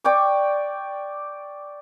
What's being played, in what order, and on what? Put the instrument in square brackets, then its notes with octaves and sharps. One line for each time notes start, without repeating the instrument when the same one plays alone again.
[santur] D5 G5 C#6 D6